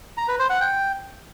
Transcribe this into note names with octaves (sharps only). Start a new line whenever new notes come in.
A#5
B4
C5
F#5
G5